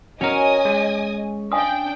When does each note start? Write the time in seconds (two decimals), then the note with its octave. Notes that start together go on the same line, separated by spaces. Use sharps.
0.21 C#4 F#4 A#4 D#5 G#5 D#6
0.65 G#3
1.52 D4 F5 G5 G#5 D#6